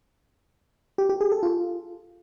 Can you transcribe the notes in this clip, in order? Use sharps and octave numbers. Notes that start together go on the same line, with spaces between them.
G4
G4
G#4
A4
F4